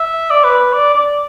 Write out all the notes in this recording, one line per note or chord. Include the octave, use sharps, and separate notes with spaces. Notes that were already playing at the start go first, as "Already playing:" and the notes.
Already playing: E5
D5
B4
B4
D5
D5